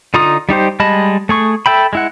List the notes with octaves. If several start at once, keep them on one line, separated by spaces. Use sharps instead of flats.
D3 D#4 F4 A#5 D#6
G3 D#4 G4 C5
G3 G#3 D#5 A5 B5
A3 G#4 C#6
A4 E5 G5 B5
G#3 E4 F#5